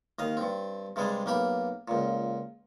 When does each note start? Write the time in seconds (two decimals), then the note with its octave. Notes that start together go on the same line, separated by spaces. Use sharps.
0.19 D#2 D#5 F5
0.37 G2 C4
0.96 G2 C3 G3 G#3 G#4
1.26 B1 A#3 G4 B5
1.88 C#2 A#2